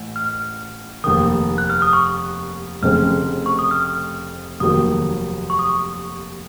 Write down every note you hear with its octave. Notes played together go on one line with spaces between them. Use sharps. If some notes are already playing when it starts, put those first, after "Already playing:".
Already playing: A1 A2
F6
F1 D#2 D#3 D#6
F#6
F6
D#6
C#6
F1 F2 C#3 A3 C4 F6
C#6
D#6
F6
F1 D#2 D#3 F#3 D#6
C#6
D#6
C#6